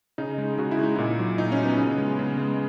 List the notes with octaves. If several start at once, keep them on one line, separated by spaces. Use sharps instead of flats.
C#3 D#4
G#3
C#3 F#4
E4
G#3 D#4
A#2 E4
F#3
A#2 D#4
C#4
F#3
B3
C#3
G#3
C#3
G#3